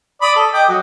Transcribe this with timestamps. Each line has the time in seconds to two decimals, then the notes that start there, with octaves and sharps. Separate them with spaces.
0.22 D5 B5 D#6
0.36 A4
0.53 D#5 G5 D6
0.68 F#3